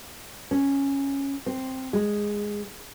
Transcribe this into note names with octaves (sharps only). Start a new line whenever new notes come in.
C#4
C4
G#3